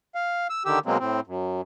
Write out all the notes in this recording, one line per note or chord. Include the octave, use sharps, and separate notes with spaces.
F5
E6
D3 D#3 G4 E6
B2 F#3 G#3 A#3 C4
A2 C4
F#2